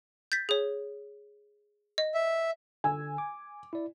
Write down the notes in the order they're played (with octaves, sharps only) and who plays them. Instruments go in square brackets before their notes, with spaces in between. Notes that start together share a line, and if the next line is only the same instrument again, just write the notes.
[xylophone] G6 A6 B6
G#4 C#5
D#5
[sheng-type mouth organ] E5
[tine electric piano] D3 E6 [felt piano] G#5
[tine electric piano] D6
E4 D5